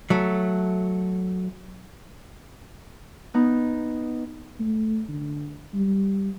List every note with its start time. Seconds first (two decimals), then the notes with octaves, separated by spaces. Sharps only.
0.10 F#3 A3
3.34 B3 D#4
4.60 A3
5.09 D3
5.74 G3